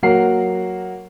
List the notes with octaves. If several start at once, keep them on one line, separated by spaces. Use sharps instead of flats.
F#3 A#3 F#4 A#4 F#5 C7